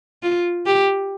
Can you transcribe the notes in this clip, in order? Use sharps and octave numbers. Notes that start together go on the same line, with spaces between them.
F4
G4